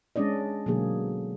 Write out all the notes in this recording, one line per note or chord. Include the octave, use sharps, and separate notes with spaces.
G#3 C#4 D4 D5 D#5
B2 D3 F#3 A#3 G#4